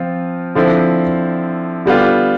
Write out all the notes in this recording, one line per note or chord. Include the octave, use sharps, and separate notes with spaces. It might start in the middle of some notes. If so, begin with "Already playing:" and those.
Already playing: F3 C4 F4
D3 F3 C4 E4
D3 G3 B3 F4